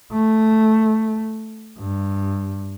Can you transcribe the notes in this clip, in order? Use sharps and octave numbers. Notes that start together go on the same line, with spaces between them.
A3
G2